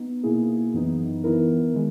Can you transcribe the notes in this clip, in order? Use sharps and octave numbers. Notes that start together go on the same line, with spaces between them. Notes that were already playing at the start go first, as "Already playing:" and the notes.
Already playing: B3 D#4
B2 A#3 E4 G#4
F#2 E3 B3 D#4
E3 B3 E4 A#4
D#3 G#3